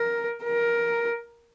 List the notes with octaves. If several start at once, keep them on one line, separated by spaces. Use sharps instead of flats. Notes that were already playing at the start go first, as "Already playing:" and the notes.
Already playing: A#4
A#4